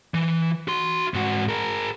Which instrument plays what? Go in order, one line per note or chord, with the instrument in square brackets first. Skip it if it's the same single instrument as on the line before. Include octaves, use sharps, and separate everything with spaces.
[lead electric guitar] E3
F#4 C6
G#2 F#4
G#4 A#4